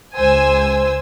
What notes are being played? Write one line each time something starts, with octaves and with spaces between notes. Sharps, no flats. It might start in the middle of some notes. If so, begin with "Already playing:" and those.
C#2 C5 G#5 E6